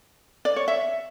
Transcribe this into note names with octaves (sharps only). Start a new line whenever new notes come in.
D5
C#5
E5